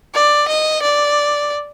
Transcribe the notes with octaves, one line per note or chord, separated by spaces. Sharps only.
D5
D#5
D5